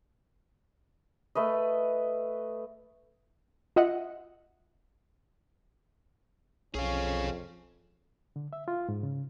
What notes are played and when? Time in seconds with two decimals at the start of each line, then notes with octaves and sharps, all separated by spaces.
1.35 A3 B4 D#5
3.76 F4 D#5 E5 F#5
6.75 B1 F2 C#4 G#4 F5
8.36 D3
8.53 E5
8.68 F4
8.89 G#2
9.03 C#3